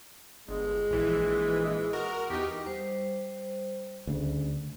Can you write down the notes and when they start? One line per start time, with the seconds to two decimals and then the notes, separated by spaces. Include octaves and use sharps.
0.48 G1 G#3
0.91 A#1 E3
1.65 G#3
1.93 F#4 A#4
2.30 E2 D#4 G4
2.66 G3 C5
4.07 D2 C#3